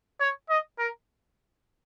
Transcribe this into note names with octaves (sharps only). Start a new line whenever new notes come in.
C#5
D#5
A#4